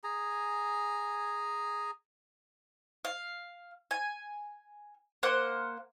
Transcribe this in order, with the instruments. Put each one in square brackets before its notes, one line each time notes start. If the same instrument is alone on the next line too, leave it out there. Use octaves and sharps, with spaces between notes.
[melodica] G#4 G#5 A#5
[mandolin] F5
G#5
A#3 C5 F#5 F#6